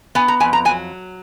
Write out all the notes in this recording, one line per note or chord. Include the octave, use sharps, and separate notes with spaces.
B3 G#5
A#5
F2 G#5
A#5
F#3 G#5